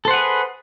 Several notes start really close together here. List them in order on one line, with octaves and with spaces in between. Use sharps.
A4 C5 F#5 G#4 B4